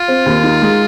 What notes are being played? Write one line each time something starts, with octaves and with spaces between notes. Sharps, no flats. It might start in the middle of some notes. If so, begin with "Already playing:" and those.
Already playing: F4
C4
D#2
D#4
G#3